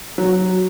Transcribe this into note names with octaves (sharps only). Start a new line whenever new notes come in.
F#3